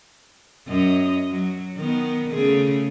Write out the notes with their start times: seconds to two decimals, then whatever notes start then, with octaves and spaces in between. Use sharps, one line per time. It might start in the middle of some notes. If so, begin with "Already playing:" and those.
0.67 F#2 C#4 D#5
1.30 F#3
1.77 D#3 B3
2.32 C#3 A3 G#4